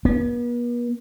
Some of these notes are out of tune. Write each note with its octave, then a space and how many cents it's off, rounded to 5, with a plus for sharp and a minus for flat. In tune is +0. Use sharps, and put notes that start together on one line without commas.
B3 -45